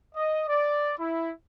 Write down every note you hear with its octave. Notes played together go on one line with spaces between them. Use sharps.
D#5
D5
E4